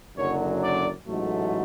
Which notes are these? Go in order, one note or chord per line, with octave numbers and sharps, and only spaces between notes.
F#1 F#2 D3 F#3 C#5
D5
A1 G#2 F#3 A3